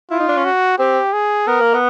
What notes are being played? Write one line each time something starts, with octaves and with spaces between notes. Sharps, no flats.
E4 F4
D#4
D4
C#4
F#4
C4 G4
G#4
B3 A#4
A#3
B3